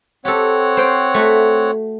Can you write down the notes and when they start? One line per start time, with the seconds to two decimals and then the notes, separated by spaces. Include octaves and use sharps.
0.25 C4 G4 A4 C#5 F#5
0.77 C5 G5
1.14 A3 F#4